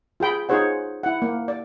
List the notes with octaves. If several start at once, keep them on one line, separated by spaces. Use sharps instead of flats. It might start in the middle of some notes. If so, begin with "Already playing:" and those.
F4 G#4 G5 B5
D#4 F4 G#4 C5 C#5 F#5
E4 F#5
A#3
D5